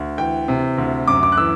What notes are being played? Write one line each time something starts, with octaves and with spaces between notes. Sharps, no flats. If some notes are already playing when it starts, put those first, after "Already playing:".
Already playing: D2
E3 G5
C3
D2
F#2 D6
D6
F#6
E3 E6